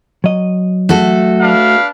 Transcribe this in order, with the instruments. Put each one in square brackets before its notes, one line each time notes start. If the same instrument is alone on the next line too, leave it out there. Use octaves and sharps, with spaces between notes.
[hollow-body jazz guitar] F#3 D#5
[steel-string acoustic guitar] A3 F#4 A4
[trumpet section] D4 B4 F5